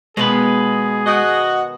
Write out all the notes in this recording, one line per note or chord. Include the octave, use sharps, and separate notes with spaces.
B2 D#3 G#3 B3 G#4 B4
F#4 D#5 F#5